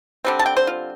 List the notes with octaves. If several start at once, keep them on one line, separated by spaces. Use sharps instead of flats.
D3 G3 C4
A5
G5
C5
F4